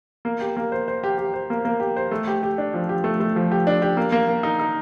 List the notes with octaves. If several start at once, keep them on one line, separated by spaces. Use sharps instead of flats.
A#3
G4
A#3
C5
C5
G4
G4
C5
A#3
A#3
G4
C5
A3
G4
G4
D4
F3
G4
A3
A3
F3
G4
D4
G4
A#3
A#3
A#3
D#4
D#4